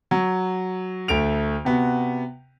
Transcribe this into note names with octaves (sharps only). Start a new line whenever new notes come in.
F#3
D2 A3 D7 F7
C3 B3 F#4